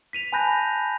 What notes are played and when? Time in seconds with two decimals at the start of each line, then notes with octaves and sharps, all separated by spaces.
0.13 B6 D#7 F7
0.32 G#5 A5 B5 F#6 G6 A#6